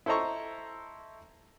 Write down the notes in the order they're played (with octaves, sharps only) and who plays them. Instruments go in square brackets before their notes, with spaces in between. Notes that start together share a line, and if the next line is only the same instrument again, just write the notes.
[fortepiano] E4 A4 C5 D#5 A#5 C#6